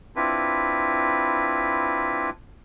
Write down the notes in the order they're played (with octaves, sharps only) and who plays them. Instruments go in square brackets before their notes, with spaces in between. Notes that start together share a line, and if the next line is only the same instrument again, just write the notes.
[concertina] C4 D4 E4 F4 B4